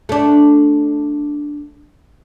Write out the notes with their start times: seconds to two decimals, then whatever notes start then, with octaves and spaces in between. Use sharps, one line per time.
0.09 A3 D4